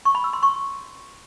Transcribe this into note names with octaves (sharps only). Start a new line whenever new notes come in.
C#6
B5
E6
C6
C#6